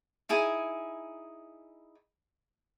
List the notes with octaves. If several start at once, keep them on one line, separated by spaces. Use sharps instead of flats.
D#4 E4 G#4 G#5